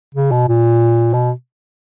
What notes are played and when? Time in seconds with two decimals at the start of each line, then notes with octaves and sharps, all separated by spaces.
0.15 C#3
0.31 B2
0.48 A#2
1.14 B2